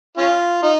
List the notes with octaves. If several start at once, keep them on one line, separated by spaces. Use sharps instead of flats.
C#4 F4
D#4